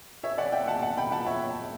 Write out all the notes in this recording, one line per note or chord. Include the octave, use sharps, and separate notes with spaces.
C#5 E5
D5 F#5
E5 G5
F#5 A5
F#5 A5
G5 B5
F#5 A5
C#5 E5